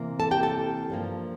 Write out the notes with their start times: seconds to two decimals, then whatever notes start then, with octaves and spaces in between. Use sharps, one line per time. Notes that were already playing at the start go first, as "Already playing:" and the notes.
Already playing: C3 E3 A#3
0.20 A4 A5
0.31 G4 G5
0.43 A4 A5
0.90 G2 F3 A#3